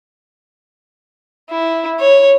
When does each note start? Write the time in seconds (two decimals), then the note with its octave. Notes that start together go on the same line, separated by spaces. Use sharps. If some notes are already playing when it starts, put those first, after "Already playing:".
1.51 E4
2.01 C#5